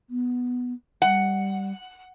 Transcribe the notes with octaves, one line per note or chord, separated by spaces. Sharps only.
B3
G3 F#5